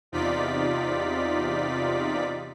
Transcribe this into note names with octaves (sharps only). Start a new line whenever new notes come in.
E2 C3 D#4 F4 D5 B6